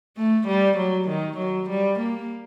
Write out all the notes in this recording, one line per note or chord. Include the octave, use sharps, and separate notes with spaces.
A3
G3
F#3
D#3
F#3
G3
A#3